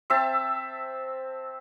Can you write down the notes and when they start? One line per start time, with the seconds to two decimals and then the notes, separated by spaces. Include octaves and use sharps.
0.10 C4 E5 A5